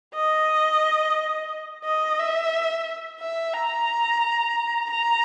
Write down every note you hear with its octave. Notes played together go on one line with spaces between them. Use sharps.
D#5
D#5
E5
E5
A#5
A#5